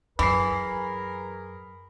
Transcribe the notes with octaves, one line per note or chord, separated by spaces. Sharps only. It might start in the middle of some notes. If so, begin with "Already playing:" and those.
F#2 E3 G#4 A#4 B5 C7